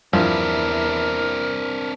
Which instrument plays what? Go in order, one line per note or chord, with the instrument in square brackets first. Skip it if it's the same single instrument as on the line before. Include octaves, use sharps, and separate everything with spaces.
[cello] E2 E4 [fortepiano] G2 F3 [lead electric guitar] C4 D4 [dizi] A#4